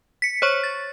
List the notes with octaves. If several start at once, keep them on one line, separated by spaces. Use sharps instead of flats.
B6 C#7
C5 C#5 C#6
A6